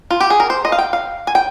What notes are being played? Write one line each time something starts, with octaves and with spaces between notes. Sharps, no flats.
F4
G4
G#4
A#4
C5
D#5
F5
G5
F5
G#5
G5